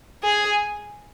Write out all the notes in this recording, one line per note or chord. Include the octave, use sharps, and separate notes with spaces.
G#4